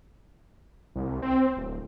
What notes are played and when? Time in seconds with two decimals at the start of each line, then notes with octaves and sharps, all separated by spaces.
0.96 C2
1.22 C4
1.57 D1